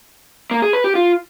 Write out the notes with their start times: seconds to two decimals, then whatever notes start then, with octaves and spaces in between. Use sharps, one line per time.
0.51 A#3
0.62 G#4
0.73 B4
0.84 G4
0.95 F4